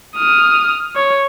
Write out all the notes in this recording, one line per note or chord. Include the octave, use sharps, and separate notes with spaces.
D#6 F6
C#5